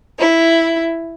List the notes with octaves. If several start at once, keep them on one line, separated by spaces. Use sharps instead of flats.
E4